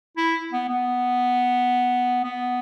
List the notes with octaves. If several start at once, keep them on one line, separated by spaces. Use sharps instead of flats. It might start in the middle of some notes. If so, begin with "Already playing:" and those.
E4
B3
B3
B3